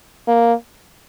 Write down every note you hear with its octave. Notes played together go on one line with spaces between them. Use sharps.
A#3